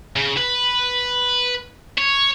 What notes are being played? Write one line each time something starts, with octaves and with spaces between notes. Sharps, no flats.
C#3
B4
C#5